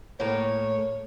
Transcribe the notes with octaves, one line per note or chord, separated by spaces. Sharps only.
A2 A#3 C#5